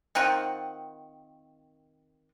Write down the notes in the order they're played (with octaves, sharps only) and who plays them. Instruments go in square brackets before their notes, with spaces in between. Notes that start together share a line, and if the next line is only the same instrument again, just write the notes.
[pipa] D#3 C4 F4 F#5